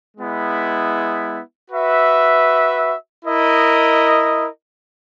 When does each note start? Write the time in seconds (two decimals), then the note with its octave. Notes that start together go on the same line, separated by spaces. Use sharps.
0.16 G#3 B3 E4
1.71 F#4 B4 E5
3.25 E4 A#4 D#5